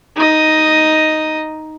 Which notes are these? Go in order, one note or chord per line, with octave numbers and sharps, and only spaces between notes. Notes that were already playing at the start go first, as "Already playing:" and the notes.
D#4 D#5